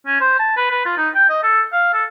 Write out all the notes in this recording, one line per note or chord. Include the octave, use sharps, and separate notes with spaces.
C#4
C5
A5
B4
B4
F4
D#4
G5
D#5
A4
F5
A4